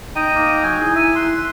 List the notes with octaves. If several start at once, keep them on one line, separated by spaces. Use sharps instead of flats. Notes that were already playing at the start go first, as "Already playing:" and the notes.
D#4 D#5 G5 A#5 D#7
A#3
F#3 G#5 G6
E4 G#4 A#5
E5 D#7
C6 F#6